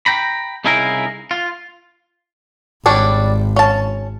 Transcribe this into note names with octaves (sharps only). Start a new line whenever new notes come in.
G5 A#5 B5
C2 C#3 D#4 E4 G#4 A#4
F4
G#1 G3 D4 C#5
C#4 A5